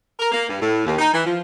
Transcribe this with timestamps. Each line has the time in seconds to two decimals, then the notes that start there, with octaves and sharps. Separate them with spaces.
0.20 A#4
0.32 A#3
0.49 G2
0.60 A2
0.85 D#2
0.99 D#4
1.13 E3
1.25 F3